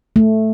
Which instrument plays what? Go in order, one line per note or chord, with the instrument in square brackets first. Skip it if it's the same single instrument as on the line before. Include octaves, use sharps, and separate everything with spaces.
[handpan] A3